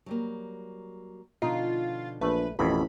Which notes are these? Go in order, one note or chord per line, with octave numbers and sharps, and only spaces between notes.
F#3 G3 A#3
B2 D3 F3 D#4 F4
A#1 E2 A3 B4
A1 F2 B2 E3 A#4 B5